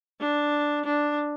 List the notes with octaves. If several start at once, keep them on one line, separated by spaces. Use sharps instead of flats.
D4
D4